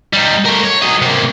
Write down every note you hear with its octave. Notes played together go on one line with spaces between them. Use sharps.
G3 D#4
A3 A#4
C#5
F#3 D#5
C3 A#3